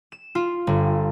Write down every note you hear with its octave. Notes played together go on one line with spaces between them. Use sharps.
E7
F4
G1